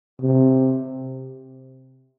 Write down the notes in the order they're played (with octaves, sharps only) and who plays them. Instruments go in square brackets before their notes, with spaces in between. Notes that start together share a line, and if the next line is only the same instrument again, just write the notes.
[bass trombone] C3